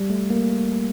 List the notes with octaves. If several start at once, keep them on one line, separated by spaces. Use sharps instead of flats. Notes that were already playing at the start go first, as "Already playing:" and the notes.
Already playing: G3
A3
A#3